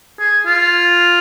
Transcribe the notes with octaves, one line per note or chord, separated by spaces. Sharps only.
G#4
F4